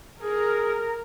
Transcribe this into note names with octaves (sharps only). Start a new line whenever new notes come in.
G#4 A#4